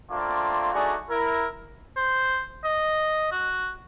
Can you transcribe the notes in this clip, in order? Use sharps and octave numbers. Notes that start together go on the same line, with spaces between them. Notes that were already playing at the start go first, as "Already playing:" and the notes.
A3 A#3 C4 D4 F4
A3 D4 D#4 F#4 G#4 D5
E4 A#4
C5
D#5
F#4